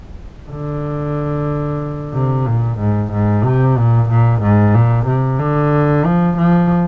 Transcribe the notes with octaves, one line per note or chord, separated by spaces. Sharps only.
D3
C3
A#2
G#2
G#2
C3
A#2
A#2
G#2
A#2
C3
D3
F3
F3